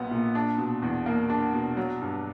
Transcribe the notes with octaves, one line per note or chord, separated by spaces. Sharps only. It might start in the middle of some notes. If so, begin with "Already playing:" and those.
Already playing: A#1 A#2 F#3 B3
A#2
D4
B2
E2
A#3
D4
B2
F#3
G2